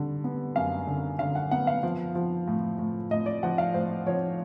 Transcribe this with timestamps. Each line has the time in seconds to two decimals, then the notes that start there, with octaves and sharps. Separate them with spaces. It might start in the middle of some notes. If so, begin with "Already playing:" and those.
Already playing: D3 G3
0.24 B3
0.56 F#2 F5
0.87 D3
1.19 D3 F5
1.35 F#5
1.51 B3 F#5
1.67 F5
1.83 F3
2.15 F3
2.48 A2
2.78 A2
3.11 A2 D#5
3.26 D5
3.43 F3 F#5
3.58 F5
3.74 A2 C5
4.06 F3 C#5